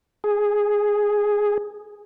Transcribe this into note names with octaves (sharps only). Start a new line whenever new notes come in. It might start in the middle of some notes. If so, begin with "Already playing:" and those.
G#4